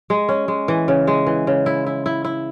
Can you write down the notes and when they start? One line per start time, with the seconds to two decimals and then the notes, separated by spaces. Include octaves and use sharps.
0.10 G#3
0.29 C#4
0.48 G#3
0.68 E3
0.88 C#3
1.07 G#3
1.26 E3
1.47 C#3
1.66 E4
1.86 E4
2.06 E4
2.24 E4